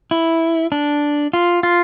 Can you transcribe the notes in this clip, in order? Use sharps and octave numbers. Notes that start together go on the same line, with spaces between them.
E4
D4
F4
F4